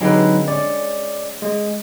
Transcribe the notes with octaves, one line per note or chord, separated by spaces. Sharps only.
D3 F#3 G#3 C4 D#4 B4
C#4 D5
G#3